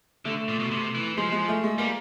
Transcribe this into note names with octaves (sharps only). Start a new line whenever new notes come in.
D3 A3
A#2
B2
C3
E3
F3 G#3
G#3
A3
G#3
G3 A#3